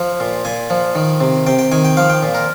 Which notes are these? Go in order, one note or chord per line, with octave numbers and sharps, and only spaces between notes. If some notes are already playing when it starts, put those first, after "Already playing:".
Already playing: F3
A#2
A#2 G#5
F3
D#3
C3
C3 G5
G5
D#3 G#5
G5
F3 F5
G5
A#2
A#4